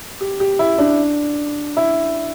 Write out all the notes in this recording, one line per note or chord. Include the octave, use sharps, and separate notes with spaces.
G4
G4
E4
D4
E4